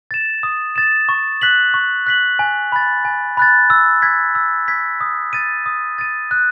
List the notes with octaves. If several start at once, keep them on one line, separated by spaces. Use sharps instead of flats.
A6 E7
D#6
A6 E7
C#6
F#6 B6 F#7
C#6
F#6 B6 F#7
G#5
B5 F#6 A6
G#5
B5 F#6 A6
E6
G#6 B6
E6
G#6 B6
D#6
A6 D#7
D#6
A6 D#7
F#6